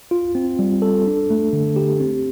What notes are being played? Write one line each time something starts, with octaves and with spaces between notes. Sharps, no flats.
F4
C4
G3
A4
D4
A3
D3
G4
C4